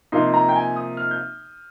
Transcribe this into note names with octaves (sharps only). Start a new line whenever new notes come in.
C3 F3 A#3 D#4 C6
A#5
G5
G#5
D#6
F6
G6